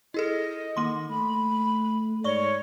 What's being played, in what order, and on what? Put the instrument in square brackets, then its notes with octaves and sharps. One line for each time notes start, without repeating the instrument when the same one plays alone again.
[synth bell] E4 G#4 A4 [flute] D#5
[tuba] D#3 [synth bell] A#3 C6
[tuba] A3 [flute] B5
[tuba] G#2 [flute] C#5 [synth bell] D5 C#6 G7